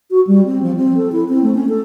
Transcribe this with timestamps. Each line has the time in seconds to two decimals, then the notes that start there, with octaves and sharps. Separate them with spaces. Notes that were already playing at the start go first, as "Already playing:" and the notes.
0.10 F#4
0.27 G3
0.46 C4
0.62 F3
0.76 C4
0.97 A4
1.12 E4
1.29 C4
1.43 A3
1.55 C#4
1.69 A4